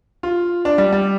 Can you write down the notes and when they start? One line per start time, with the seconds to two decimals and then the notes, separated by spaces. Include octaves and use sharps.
0.23 F4
0.65 D4
0.78 G3
0.93 G3